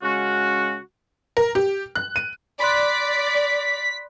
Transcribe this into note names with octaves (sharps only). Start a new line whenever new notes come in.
C#3 G#3 C#4 F#4
A#4
G4
F#6
D#7
D5 B5 C6 F#6 B6